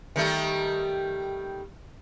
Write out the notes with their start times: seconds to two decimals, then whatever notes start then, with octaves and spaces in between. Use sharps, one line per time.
0.16 D#3 G3 A3